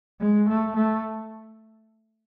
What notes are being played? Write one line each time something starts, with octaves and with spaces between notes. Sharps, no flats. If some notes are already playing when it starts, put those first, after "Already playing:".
G#3
A3
A3